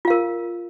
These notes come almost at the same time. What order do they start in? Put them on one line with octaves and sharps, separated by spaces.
F4 F5 A#4